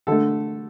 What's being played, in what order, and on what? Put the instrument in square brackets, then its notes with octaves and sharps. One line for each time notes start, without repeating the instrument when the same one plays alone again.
[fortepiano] D3 A3 A4